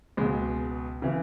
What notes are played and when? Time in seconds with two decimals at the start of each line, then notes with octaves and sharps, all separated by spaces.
0.17 C#2 B2 G#3
1.02 C#3 E3